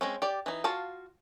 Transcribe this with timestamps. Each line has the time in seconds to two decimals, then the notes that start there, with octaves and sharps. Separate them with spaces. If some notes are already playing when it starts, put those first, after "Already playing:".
0.01 G#3 C4 C#4
0.22 G4 D5
0.46 E3 D#4
0.64 F4 F#4 F5 A5